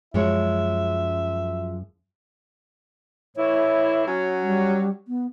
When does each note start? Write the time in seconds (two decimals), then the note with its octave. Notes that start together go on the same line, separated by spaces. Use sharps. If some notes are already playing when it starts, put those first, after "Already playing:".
0.14 F#2 F3 G#3 C#5 E5
3.37 A2 E3 E4 C#5
4.07 F#3 C#4
4.43 G3
5.08 B3